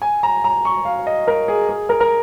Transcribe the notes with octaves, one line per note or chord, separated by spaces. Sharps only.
G#5
A#5
A#5
C#6
F5
D#5
A#4
G#4
G#4
A#4
A#4